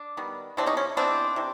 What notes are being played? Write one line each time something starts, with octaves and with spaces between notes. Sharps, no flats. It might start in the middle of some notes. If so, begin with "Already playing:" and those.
Already playing: D4
D#3 G3 B3
C3 E3 G#3 B3 C4 D4
C#4 D#4
C#4
C3 E3 G#3 B3 C4 D4
C3 E3